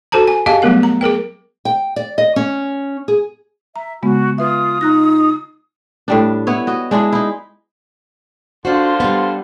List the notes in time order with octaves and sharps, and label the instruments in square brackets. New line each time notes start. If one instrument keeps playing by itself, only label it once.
[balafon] F#4 A4 C5 A5 A#5
G#5
G4 G#4 D#5 F5 G#5 A5
F#3 G3 A3 B3 A#4 F#5
A#5
G#4 A#4 B4 G5
[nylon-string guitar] G5
D5
D#5
C#4
G#4
[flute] E5 [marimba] A#5
[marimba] C#3 G#3 B3 [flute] F#4
[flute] F4 [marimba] B4 E5 [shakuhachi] D#6
[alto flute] D#4 [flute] F4 [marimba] A#5 F#6 A#6
[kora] A2 G3 D4
B3 E4 C#5
F#4 D#5
G#3 D4 E4 G#4
D#4 E4
[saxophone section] D3 F4 C5 [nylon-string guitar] D4 F#4
[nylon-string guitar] G3 B3